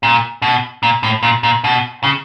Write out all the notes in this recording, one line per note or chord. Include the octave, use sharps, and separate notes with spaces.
A#2
B2
A#2
A2
A#2
A#2
B2
C#3